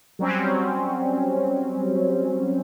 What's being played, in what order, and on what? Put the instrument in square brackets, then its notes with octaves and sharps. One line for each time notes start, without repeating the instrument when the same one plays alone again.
[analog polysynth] F#3 G3 C4 C#4